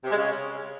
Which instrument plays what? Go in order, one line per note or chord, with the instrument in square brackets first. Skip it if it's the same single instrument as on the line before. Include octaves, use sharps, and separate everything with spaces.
[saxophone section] C3
G#3
C#3